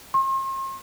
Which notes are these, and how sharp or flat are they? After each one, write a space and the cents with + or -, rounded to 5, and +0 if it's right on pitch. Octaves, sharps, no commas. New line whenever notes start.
C6 +40